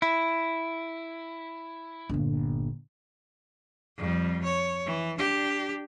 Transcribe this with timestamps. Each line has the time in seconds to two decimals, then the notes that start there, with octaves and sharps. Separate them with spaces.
0.02 E4
2.10 G1 A#2
3.98 F2 G3
4.43 C#5
4.85 E3
5.18 D4 G4